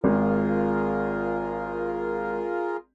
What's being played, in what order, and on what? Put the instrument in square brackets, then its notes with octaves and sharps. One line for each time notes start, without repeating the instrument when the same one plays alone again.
[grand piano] G#1 [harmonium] F4 G#4 A#4